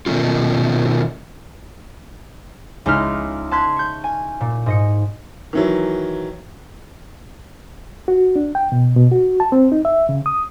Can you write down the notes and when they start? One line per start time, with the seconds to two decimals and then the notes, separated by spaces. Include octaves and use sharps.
0.06 B2 D#3 A3 C#4 F4
2.86 C#2 G#3 D#4 E4 F6
3.51 A5 C6 F#6 G#6 B6
3.76 C#6 G6
4.04 G#5
4.41 A#2
4.66 G#2 D#5 C#7
5.53 D#3 E3 F#3
8.08 F#4
8.36 D4
8.55 G5
8.72 B2
8.96 B2
9.12 F#4
9.40 A5
9.52 C4
9.72 D#4
9.85 E5
10.09 C#3
10.26 D#6